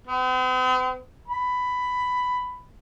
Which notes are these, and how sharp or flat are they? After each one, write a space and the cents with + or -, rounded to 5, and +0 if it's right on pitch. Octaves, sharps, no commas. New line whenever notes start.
C4 -45
B5 +10